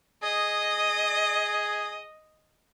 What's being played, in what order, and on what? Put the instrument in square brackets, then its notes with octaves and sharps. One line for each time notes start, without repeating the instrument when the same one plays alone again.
[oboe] G#4 [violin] D#5